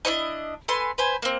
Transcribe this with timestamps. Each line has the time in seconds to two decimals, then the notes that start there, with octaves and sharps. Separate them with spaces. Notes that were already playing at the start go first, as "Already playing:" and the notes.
0.05 D4 E4 C#5 D#5
0.68 A4 B4 G#5 C6
0.98 B4 C5 G#5
1.22 A#3 C4